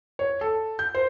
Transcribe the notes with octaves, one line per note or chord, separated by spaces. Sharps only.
C#5
A4
G6
C5